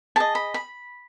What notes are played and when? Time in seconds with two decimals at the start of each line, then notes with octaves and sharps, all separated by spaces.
0.16 G#4 D#5 A5
0.35 B5
0.54 B5